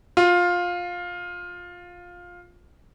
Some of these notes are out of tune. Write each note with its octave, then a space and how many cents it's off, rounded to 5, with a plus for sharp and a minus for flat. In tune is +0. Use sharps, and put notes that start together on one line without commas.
F4 +15